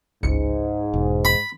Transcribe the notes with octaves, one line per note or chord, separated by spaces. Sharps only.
G1 C#2 G#2 C#7
E1
B5